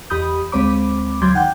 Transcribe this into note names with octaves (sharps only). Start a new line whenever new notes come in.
E2 G4 B5 D#6 G6
D2 G#3 C4 C5 B5 D6
D2 F#3 C6 D6 G6 G#6
D#3 F#5 G5 G6